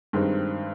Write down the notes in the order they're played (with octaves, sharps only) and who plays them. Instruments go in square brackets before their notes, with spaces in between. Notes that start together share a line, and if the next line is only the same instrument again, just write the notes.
[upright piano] G2 D#3 G#3 C4